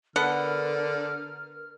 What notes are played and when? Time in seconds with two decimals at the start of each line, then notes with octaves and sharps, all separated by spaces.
0.16 D3 B3 A4 A#4 F#5 F6